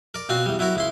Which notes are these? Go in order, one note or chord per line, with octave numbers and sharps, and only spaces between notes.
A#4 D5
B2 C4 F4 F#4
E2 G3
F#3 E4 F#4 A#4
C#2 E4 C6